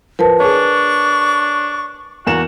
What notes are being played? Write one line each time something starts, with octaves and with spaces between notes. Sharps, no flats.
F3 A#4 B4 A5
D4 G#4 C#5 C#6
E2 A#3 F#4 E7